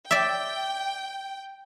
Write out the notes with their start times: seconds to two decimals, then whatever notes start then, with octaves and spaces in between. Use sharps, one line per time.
0.11 D5 E5 G5